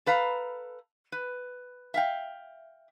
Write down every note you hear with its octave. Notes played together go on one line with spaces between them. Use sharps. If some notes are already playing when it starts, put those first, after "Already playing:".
A4 B4 F5 A#5
B4
E5 F5 G5